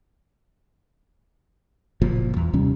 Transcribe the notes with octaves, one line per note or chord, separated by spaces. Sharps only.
F#1 A#2 F3
E2
D#2 C3 G3 C#4